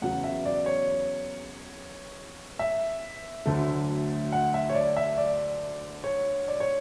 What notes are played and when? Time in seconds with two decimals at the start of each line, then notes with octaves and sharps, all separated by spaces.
0.02 E2 C#3 F#3 B3 F#5
0.24 E5
0.45 D5
0.66 C#5
2.59 E5
3.46 D2 D3 F#3 A3
4.32 F#5
4.54 E5
4.69 C#5
4.75 D5
4.97 E5
5.18 D5
6.04 C#5
6.48 D5
6.60 C#5